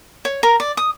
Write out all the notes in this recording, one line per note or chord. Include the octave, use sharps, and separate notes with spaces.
C#5
A#4
D5
D#6